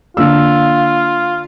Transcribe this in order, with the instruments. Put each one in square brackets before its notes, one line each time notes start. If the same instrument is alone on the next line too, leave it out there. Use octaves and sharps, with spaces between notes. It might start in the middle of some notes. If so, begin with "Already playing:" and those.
[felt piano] D3 A#3 E6 [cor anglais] F4